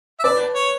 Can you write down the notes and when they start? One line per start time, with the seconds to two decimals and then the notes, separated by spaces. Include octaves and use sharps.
0.20 E5
0.24 B4 D5
0.55 C#5